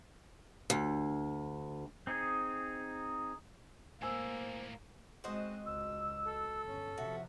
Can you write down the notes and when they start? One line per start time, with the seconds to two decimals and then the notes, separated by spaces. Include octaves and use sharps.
0.70 D2
2.07 C4 D#4 G#4
4.02 A2 G#3 A#3 C5 G#5 E6
5.24 G#3 C4 F#4 C5 D#5
5.66 C#2 E6
6.26 A4
6.64 G1 C#4
6.98 C3 F3 F#4 E5